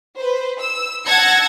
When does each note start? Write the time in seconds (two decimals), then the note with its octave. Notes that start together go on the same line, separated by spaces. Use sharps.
0.18 B4 C5
0.58 E6
1.05 F#5 A5 E6 G#6 A#6 C#7